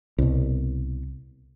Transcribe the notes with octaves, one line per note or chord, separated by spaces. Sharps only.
C2 B2